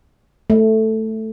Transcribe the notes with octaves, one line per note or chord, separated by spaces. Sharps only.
A3